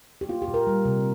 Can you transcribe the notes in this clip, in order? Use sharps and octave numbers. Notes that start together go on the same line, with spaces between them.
G4
A#3 F4
G4
A#2
A#4
G3
C3